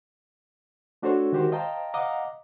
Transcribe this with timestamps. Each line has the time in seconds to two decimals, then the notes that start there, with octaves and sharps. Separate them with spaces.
1.02 A3 D4 F#4 A4 C5 C#5
1.32 D#3 G#3 F#4 G4 A#4 C5
1.52 C5 D#5 F5 G5 A5 A#5
1.94 D#5 F5 F#5 A#5 D6